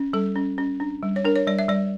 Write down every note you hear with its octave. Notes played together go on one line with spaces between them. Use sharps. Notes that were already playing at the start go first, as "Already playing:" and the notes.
Already playing: C#4
G3 A4
C#4
C#4
D4
G3
C#5
D4 A#4
C#5
G3 D5
E5
G3 D5